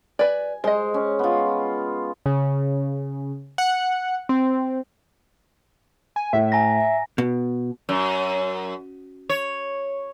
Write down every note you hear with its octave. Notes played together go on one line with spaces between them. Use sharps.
B4 D5 G#5
G#3 C5 D#5
C#4
B3 F4
C#3
F#5
C4
G#5
A2 E5
G#5 A#5 A#6
B2
F#2
C#5